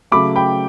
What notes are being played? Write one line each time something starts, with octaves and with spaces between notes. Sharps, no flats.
C#3 F#3 A3 B5 D6
G5 B5